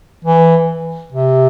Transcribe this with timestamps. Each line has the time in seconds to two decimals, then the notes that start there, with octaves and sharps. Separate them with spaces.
0.25 E3
1.12 C3